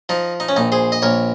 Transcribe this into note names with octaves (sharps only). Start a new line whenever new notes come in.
F3 D#4
D#4
C#4
A#1 D#4
G#4 C5
D#5
A#1 A#4 C#5